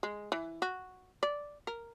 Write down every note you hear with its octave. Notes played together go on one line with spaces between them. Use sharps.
G#3
E3
F#4
D5
A#4